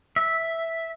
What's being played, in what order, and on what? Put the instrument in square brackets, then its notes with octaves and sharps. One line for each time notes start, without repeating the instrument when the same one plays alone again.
[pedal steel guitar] E5